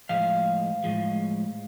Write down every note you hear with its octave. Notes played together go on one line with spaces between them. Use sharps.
A2 F3 G#3 F5
A2 F3 G#3